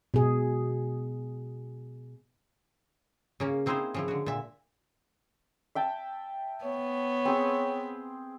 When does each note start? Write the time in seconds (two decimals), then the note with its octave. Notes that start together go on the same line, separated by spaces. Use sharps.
0.14 B2 G#4
3.40 C#3 A#3 C#4
3.66 A#3 C4 D#4 E4 G#4 C5
3.94 C#3 F3 E4
4.08 D3 F#4
4.26 A#2 E5
5.75 E5 G5 A5
6.64 B3 C#5
7.25 C4 G#4